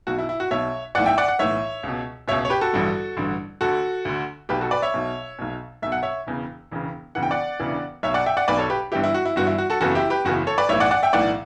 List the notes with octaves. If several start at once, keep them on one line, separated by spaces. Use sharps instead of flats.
B1 B2 F#4
E4
E4
F#4
B1 B2 C#5 E5
B1 A2 E3 D5 F#5
E5 G5
D5 F#5
F#5
B1 A2 E3 C#5 E5
C#2 B2
C#2 B2 C#5 E5
C#5
G4 B4
F#4 A4
A1 G2 D3
A1 G2 D3
D2 D3 F#4 A4
D2 D3
B1 B2 G4 B4
F#4 A4
B4 D5
C#5 E5
B1 B2
B1 B2
B1 B2 E5
F#5
C#5 E5
E1 E2 C#3
E1 E2 C#3
E1 D2 C#3 E3 F#5
G5
D5 F#5
E1 D2 C#3 E3
B1 B2 C#5 E5
D5 F#5
E5 G5
D5 F#5
B1 B2 B4 D5
A4 C#5
G4 B4
G1 G2 E3 E4 G4
E4
F#4
E4
G1 G2 E3 F#4
E4
F#4
F#4 A4
F#1 E2 C#3 E3 F#4 A4
E4 G4
G4 B4
F#1 E2 C#3 E3 F#4
A4 C#5
B4 D5
B1 A2 E3 C#5 E5
D5 F#5
D5 F#5
E5 G5
B1 A2 E3 D5 F#5